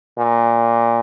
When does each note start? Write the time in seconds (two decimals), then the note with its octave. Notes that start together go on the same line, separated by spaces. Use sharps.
0.19 A#2